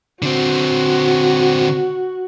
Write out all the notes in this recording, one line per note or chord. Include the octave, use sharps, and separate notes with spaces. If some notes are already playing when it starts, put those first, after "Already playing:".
D3 C4 F#4